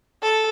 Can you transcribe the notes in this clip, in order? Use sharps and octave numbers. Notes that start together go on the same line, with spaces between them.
A4